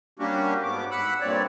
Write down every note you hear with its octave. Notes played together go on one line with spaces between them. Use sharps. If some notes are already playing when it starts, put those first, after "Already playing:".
G3 A#3 C#4 D4 F#4 G4
G#2 B3 D6
F#5 B5 E6 F#6
G2 A#2 C4 C#5 D5